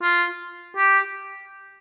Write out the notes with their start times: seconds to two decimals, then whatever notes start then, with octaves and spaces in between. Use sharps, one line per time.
0.02 F4
0.77 G4